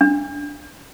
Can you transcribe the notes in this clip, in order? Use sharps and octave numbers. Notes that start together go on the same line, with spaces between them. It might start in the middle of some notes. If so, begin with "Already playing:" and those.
D4